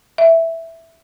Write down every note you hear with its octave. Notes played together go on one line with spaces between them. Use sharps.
E5